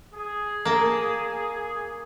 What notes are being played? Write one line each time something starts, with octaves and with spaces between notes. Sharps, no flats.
G#4
A#3 A5